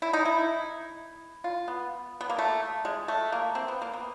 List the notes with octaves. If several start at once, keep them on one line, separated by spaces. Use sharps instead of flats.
E4
D#4
E4
F4
B3
B3
A#3
A3
G#3
A3
A#3
C4
B3
A#3
B3